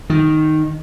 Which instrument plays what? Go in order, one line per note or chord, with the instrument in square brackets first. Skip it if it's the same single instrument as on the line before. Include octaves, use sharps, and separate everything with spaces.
[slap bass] D#3